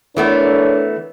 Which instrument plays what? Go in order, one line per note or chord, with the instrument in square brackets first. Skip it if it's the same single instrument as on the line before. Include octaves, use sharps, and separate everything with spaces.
[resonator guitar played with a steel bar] E3 A3 B3 [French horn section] D4 A#4 C#5